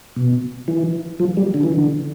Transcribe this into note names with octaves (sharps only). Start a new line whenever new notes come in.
B2
E3
F3
G3
D3
E3
D3